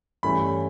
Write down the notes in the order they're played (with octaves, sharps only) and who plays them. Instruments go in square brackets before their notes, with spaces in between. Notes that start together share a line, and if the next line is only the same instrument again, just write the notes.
[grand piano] G2 E3 A3 C#4 B5